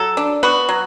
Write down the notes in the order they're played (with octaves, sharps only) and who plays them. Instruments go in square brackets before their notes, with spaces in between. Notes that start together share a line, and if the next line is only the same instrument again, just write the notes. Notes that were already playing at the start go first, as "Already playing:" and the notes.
Already playing: [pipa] F#3 A4
D4
B3 F#4
F#3